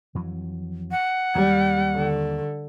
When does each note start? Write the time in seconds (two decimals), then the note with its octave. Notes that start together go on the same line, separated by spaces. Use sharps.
0.15 F2 E3 F#3
0.91 F#5
1.35 D#2 G3
1.95 D3